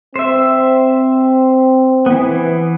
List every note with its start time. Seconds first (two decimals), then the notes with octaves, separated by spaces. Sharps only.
0.16 C4 C5 E5
2.06 E3 B3